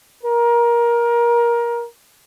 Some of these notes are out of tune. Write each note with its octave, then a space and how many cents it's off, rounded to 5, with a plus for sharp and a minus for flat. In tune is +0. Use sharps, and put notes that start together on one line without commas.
A#4 +20